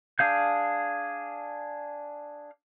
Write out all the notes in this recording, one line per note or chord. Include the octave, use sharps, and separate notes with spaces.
D4 G#4 F5 G6